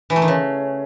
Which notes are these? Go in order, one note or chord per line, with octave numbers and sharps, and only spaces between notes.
E3
A3
D#3
C#3